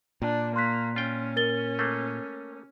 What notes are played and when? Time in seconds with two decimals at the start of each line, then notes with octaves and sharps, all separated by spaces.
0.22 A#2 D4
0.56 A#3 C6 F#6 B6
0.96 C#4 F4 G5
1.36 A#4 A6 G7
1.79 A3 A#3